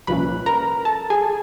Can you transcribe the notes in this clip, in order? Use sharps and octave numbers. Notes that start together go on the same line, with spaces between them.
C2 A#2 F3 A#3 C#4 B4 B5
A#4 A#5
A4 A5
G#4 G#5